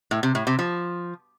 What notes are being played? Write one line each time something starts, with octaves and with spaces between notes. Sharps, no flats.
A2
C3
A2
C3
F3